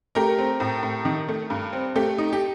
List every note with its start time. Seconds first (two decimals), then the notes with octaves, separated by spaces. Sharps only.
0.15 A3 G4 A#4
0.38 C4
0.60 A2
0.83 A2
1.05 D#3
1.29 A3
1.50 G2
1.73 C4
1.96 A3 G4
2.18 D#4
2.33 G4